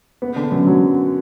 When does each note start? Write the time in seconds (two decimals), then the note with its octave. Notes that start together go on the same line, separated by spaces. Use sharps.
0.22 B3
0.36 D3
0.52 F#2
0.67 F#3